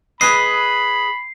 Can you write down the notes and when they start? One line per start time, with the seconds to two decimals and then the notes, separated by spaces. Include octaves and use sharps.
0.21 G#4 B4 D#5 B5 C7